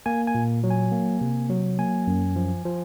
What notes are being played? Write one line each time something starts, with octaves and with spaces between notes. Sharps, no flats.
A#3 G#5
G#5
A#2
F#3
G#5
A#3
C3
F#3
A#3 G#5
F#2
F3
F3